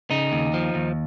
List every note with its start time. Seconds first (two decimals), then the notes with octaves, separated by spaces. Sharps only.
0.10 C#3 D#4
0.32 D#2
0.54 F3
0.75 D#2